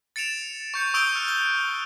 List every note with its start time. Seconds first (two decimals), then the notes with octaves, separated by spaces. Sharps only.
0.16 A6 C#7 D7 E7 F7
0.74 C#6 G6 C#7
0.94 C#6 D#6 E6 G6 D7 G7
1.15 F6 F#6 C#7
1.28 G7